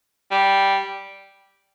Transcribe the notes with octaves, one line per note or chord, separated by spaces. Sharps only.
G3